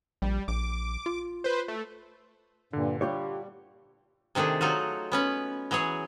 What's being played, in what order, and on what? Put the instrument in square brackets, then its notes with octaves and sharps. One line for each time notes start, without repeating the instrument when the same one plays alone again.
[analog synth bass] A#1 [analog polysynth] G3
[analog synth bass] A#1 [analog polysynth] D6
[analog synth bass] F4
[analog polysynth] B4 C5
A3
[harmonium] G2 A#2 [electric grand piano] D3
[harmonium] G3 [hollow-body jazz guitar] F4 G4 C#5
[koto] C3 D#3 A3 D4 G#4
F#3 D#4 F4 F#4
B3 C#4 B4
E3 F#3 G#4 C#5